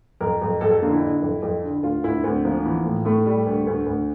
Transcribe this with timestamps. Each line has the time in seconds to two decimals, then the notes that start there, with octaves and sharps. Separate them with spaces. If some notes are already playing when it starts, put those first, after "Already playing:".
0.21 F2 A#4
0.41 F2
0.61 F2 A4
0.71 A4
0.82 D3 A#3
0.91 E4
1.02 D3
1.22 F2
1.42 F2
1.63 D3
1.83 D2 F4
2.04 D2 E4
2.24 D2 C4
2.44 F3 A#3
2.65 E3
2.85 A2
3.05 A2 A3
3.26 G3
3.46 D2
3.67 D2
3.86 D2